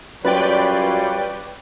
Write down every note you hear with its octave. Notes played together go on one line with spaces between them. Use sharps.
F#2 G3 F4 B4 C#5 D5 G5